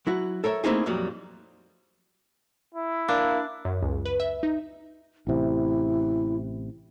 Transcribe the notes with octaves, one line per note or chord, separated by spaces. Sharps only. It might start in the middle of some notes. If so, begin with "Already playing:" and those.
F#3 E4 F#4
A4 A#4 C#5 E5
A3 A#3 C4 D#4 E4 G#4
F2 A#2 F#3 G3
E4
A#3 D4
F#2
C#2
B4
E5
D#4
A1 C3 E4